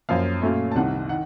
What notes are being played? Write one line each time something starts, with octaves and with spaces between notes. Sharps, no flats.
F#2 F3 A#3 F5
A#2 F#3 A3 C#4
A5
C2 C3 D#3 F#5
D#3 F#5